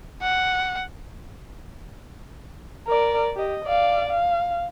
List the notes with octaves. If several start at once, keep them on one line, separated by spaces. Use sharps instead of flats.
F#5
A#4 D5
G4 D#5
D5 F5
F5